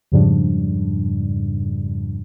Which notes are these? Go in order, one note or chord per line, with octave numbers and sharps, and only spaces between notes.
F2 G#2 C#3 F3 G3 D4